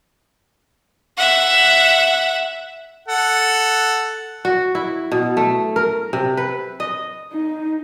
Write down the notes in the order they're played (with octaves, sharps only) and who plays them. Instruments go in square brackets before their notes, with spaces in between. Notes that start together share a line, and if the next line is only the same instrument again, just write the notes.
[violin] E5 F#5
[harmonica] A4 F#5
[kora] F#4
E4
B2
A3
A#4
C3
B4
D#5
[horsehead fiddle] D#4